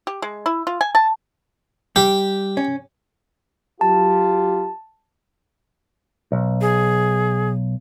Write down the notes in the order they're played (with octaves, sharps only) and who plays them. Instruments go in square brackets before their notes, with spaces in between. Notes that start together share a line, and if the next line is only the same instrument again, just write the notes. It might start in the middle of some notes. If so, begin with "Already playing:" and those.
[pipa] G4
G#3
E4
F4
G#5
A5
[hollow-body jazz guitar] G3 [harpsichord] G4
[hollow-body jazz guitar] C#4
[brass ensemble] F#3 F4 G4 [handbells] A5
[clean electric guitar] B1
[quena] G#4